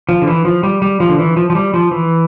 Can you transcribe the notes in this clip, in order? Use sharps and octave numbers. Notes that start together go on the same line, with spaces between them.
F3
D3
E3
F3
G3
G3
F3
D3
E3
F3
F3
G3
F3
E3